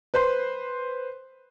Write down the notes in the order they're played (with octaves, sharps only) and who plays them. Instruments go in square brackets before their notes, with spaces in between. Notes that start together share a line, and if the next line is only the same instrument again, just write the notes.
[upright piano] B4 C5 C6